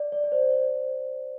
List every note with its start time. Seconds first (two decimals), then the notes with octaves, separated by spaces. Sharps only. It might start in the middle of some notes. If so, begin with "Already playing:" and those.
Already playing: D5
0.12 D5
0.24 D5
0.32 C5